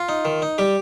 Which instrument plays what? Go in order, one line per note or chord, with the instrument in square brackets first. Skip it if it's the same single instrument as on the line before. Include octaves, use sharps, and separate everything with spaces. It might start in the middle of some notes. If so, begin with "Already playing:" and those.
Already playing: [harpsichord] F4
D#4
D#3
D#4
G3 G4